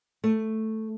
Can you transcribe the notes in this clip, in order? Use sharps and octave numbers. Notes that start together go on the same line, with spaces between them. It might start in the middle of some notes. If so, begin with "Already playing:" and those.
A3